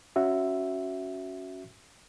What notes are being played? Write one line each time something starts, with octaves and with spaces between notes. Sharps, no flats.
C#4 F#4 E5